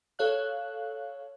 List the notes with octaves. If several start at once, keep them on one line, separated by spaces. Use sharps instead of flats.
A4 C#5 F5 F#6